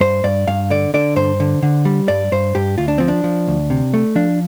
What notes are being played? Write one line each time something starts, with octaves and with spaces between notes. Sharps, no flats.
G2 C5
G2 D5
G2 F5
D3 D5
D3 D5
G2 C5
D3
D3
G3
G2 D5
G2 C5
G2 G4
D2 F4
D4
F3 C4
D4
F3
D2
C3
A3
F3 D4